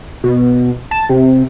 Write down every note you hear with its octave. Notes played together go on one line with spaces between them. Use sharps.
B2
A5
C3